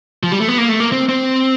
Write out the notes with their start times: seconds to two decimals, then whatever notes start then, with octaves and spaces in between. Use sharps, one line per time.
0.23 F3
0.32 G3
0.40 A3
0.48 B3
0.58 A#3
0.69 A3
0.80 A#3
0.92 C4
1.09 C4